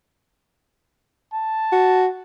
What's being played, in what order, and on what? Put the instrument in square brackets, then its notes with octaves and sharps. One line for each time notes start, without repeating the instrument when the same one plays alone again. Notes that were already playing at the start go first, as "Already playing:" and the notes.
[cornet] A5
[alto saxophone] F#4